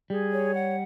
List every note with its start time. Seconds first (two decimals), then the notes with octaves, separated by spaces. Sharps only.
0.10 G3 G#4
0.31 C#5
0.52 F#5